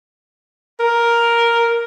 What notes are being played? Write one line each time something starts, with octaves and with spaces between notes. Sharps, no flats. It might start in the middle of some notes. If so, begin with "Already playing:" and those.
A#4